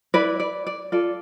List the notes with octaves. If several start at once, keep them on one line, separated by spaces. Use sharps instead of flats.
E4 B4 D5
D5
D5
F4 A4 D5